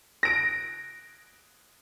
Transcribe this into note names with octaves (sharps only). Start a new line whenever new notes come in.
A#6 D7